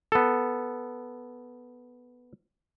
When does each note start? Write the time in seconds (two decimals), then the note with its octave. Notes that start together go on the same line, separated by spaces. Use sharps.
0.12 B3 A4